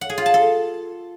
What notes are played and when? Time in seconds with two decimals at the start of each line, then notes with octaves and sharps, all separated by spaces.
0.01 F#5
0.09 G#4
0.18 F4
0.26 A5
0.34 A4